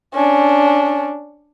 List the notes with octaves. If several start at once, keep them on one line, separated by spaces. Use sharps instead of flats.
C#4 D4